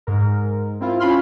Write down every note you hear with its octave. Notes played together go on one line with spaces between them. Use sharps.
G#2 A#4
C4 E4 F4
C#4 F4 B5 C6 F6